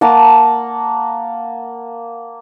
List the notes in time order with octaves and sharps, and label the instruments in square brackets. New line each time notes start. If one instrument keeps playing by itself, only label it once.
[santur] A#3 F#5 A5 A#5